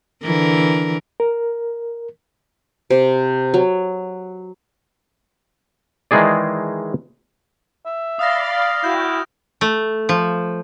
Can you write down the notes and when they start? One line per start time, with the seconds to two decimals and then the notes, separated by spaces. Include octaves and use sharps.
0.23 D3 E3 A#4
1.20 A#4
2.90 C3
3.54 F#3
6.11 D#3 E3 G#3 D#4 G#4 D5
7.86 E5
8.19 D5 F5 B5 D#6 F6 A6 A#6
8.84 E4 F#4 G5 G6
9.61 A3
10.09 F3